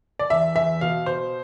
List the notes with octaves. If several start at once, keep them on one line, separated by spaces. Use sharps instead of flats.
D5
E2 E5
E2 E5
B2 F5
B2 C5